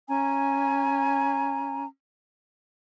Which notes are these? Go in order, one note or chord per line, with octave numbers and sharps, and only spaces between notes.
C#4 G#5 A#5